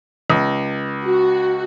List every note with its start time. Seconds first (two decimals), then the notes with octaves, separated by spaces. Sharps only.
0.30 C#2
1.03 F#4